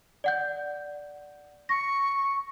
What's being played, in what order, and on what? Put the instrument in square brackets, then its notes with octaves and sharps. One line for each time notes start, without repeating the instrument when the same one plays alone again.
[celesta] D5 F#5 G6
[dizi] C#6 [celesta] A#6